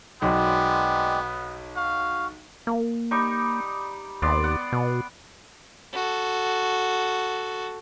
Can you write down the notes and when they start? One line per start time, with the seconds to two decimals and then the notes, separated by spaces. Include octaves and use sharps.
0.22 B1 F#3 G#3 B3 C4 D5
1.76 F#4 F5
2.67 A#3
3.11 G3 D#4 C#6
4.22 D#2 B3 D5 C6
4.44 F#5
4.73 B2
5.94 F#4 A4